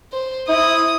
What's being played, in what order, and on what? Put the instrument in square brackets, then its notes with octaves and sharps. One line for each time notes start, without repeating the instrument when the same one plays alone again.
[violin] C5
[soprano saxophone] E4 [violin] D#6